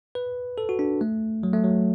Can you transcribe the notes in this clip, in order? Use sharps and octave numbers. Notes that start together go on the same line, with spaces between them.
B4
A4
F#4
D4
A3
F#3
A3
F#3